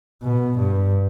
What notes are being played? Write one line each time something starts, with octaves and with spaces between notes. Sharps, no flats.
B2
G2